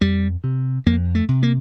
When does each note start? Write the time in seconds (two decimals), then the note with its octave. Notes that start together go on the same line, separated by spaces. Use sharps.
0.01 F2 G3
0.44 C3
0.86 F2 A#3
1.15 A3
1.28 C3
1.43 A#3